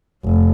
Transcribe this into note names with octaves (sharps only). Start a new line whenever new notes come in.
F1